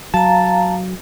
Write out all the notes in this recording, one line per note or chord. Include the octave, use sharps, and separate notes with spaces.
F#3 F5 A5 A#5 A6